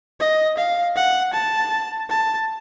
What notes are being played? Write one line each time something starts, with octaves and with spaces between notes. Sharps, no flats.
D#5
F5
F#5
A5
A5